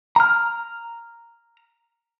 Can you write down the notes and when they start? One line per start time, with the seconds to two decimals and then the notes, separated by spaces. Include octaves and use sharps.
0.16 A#5 F6